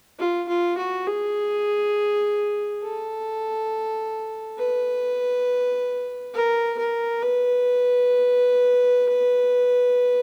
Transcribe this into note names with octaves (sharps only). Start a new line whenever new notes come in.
F4
F4
F#4
G#4
A4
B4
A#4
A#4
B4